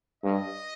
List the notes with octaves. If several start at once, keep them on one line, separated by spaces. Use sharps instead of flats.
G2 D#5